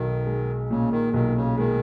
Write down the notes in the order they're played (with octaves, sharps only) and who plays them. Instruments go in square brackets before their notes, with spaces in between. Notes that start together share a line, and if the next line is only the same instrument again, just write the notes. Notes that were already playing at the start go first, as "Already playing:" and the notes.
Already playing: [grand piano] B1 [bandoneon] D#3
[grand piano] G#3
[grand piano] A#2 [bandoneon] C#3
[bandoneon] D#3
[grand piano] B1 [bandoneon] D#3
[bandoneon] C#3
[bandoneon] D#3 [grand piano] G#3